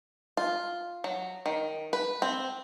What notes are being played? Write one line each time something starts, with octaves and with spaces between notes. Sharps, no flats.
F4
F#3
D#3
B4
C4